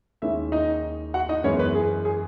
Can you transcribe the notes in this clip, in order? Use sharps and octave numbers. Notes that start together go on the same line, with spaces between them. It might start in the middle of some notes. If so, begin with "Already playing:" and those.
D#2 D#3 G#3 C#4 E4 E5
D#4 D#5
F#4 F#5
D#4 D#5
F#2 E3 G#3 B3 C#4 C#5
B3 B4
G#4
G#4